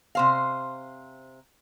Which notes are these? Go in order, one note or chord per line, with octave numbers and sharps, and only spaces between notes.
C3 C5 F5